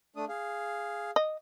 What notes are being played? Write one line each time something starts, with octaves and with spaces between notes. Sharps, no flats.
A3 D4 D#6
G#4 F5
D#5